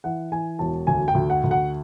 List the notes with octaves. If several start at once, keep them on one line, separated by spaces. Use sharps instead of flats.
E3 F#5
E3 G#5
E1 A5
D2 G#5
G5
D2
F#5
D2
F#5